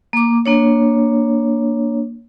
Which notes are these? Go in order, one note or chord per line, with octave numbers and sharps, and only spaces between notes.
A#3 D6
A#3 D4 C#5